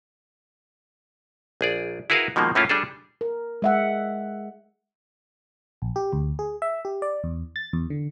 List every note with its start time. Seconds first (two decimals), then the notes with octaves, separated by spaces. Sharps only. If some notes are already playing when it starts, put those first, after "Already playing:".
1.61 A#1 G#4 D5
2.10 E4 F#4 G#4 A#4 B4 F5
2.36 B2 D#3 F3 G#3 A#3
2.55 A2 A3 A#3 C#4 E4 F4
2.69 G3 D4 G#4 A4
3.21 A#4
3.62 G#3 E5 F#5
5.82 A#1
5.96 G4
6.13 D2
6.39 G#4
6.62 E5
6.85 G4
7.02 D5
7.24 E2
7.56 A6
7.73 E2
7.90 D3